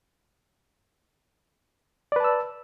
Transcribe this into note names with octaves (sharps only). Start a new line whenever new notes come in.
B4 D5 A5 E6